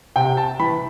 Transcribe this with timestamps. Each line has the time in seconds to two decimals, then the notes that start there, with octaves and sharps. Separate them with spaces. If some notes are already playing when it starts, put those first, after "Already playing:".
0.16 C3 G5
0.37 A5
0.60 E3 B5